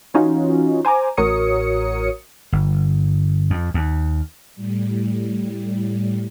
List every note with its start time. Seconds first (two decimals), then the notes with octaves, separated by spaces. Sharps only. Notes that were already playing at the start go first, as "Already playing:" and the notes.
0.14 E3 C#4 D#4 F4 F#4
0.85 C5 G#5 A#5 D6
1.17 A1 F#4 A#4 C#5 D#6 C#7
2.52 G1
3.50 F2
3.74 D#2
4.56 A2 G3